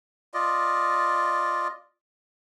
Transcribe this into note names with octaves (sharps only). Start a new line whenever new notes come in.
F4 D5 D#5